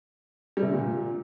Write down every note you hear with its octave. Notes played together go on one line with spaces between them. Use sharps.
G3
C3
D3
A#2